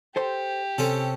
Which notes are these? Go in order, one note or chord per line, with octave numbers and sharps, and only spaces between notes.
G4 A4 C5 C6
C3 C4 C#4 A4